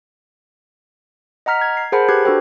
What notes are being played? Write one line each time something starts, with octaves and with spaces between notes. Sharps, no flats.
D#5 F#5 A#5 F6 B6
G#6
C7
G#4 A#4 C5 F#5 A5 B5
G4 B4 F#6 G#6 C7
D4 F#4 A4 C5 G5